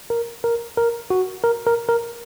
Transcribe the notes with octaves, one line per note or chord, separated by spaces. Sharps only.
A#4
A#4
A#4
F#4
A#4
A#4
A#4